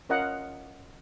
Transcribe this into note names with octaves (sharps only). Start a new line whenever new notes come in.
C#4 F4 A#4 D#5 F5 F#5